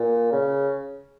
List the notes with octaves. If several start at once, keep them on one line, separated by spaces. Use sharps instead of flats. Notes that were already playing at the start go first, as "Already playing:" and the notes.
Already playing: A#2
C#3